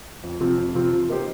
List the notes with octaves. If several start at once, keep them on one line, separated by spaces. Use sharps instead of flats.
F2
C3 F3 C4 F4
F2
C3 F3 C4 F4
F3
A#3 D#4 G4 C5